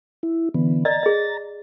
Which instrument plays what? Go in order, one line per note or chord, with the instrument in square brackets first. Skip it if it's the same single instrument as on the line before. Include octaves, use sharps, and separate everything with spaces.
[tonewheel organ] E4
D3 E3 B3
[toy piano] D5 D#5 [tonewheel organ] A#5 A6
[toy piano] G#4 D#5